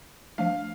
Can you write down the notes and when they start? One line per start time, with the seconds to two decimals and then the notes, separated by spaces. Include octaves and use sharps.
0.38 F3 A3 D4 F5